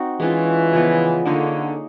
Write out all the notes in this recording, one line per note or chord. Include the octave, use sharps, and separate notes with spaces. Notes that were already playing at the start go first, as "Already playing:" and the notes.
Already playing: C4 D#4 F#4
E3 G#3 C#4 F4
C#3 F3 G#3 B3
D3 A#3 D#4 G#4 C#5